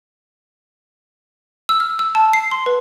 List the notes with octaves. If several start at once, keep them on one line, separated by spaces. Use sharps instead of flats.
E6
F6
E6
A5
C7
C6
B4